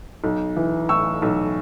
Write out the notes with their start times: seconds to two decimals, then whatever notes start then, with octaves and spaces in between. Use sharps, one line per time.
0.24 B1
0.57 E3
0.89 A2 C#6 E6
1.22 B1